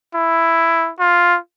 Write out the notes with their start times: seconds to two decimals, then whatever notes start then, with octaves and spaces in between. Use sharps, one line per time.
0.15 E4
1.00 F4